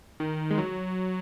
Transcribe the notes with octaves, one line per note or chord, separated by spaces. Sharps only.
D#3
G#3
F#3